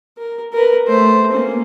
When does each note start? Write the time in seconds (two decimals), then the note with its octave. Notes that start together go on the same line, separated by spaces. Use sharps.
0.18 A#4
0.53 A#4 B4
0.87 A3 C5
1.32 A#3 C#4